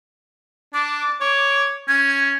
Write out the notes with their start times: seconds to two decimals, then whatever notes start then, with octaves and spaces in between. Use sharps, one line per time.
0.74 D4 D6
1.21 C#5 D6
1.88 C#4 G#6